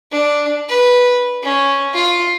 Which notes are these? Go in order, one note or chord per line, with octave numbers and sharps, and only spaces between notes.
D4
B4
C#4
F4